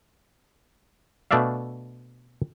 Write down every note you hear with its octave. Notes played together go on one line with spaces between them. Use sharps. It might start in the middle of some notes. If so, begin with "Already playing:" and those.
B2 A3 D4 D5 E5 F5